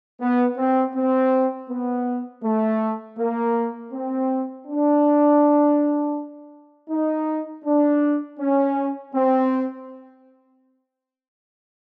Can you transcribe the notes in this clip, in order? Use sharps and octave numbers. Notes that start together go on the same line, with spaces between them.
B3
C4
C4
B3
A3
A#3
C4
D4
D#4
D4
C#4
C4